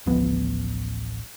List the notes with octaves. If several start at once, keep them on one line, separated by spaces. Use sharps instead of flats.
D1 A1 F3 B3